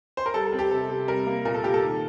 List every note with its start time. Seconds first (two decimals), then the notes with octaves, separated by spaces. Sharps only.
0.17 C5
0.26 A#4
0.34 G3 A4
0.46 A4
0.53 C4
0.59 G4
0.71 C3 A4
0.89 C3
1.08 G3 A#4
1.27 A#3
1.45 A#2 A#4
1.54 A4
1.64 A#2 G4
1.74 A4
1.83 D#3